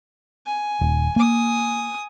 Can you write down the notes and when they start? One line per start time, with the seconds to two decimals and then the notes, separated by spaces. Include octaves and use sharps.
0.46 G#5
0.81 D#1
1.16 A#3 G#5 D#6